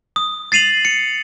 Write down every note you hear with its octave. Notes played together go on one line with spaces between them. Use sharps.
D#6
A6 C7 D#7 F7 F#7
C#7